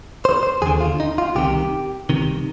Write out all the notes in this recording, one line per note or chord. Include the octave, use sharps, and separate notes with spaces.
C5
C5
D#2 D3 G#4
F4
D#4
F4
C2 C3 D#3 G4
C2 C3 D#3